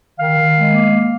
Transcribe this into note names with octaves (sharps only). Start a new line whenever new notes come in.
D#3 F5
D#3
G#3
A#3
A#3